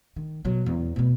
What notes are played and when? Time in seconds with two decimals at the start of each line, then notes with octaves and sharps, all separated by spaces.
0.16 D#3
0.45 B2 F#3
0.66 E2
0.96 B2 B3